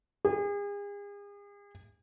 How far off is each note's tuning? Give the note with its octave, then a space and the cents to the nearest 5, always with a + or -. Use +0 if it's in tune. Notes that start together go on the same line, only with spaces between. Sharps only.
G#4 -40